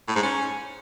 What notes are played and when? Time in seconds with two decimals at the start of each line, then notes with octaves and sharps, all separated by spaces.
0.08 A2
0.16 G#2
0.23 C#4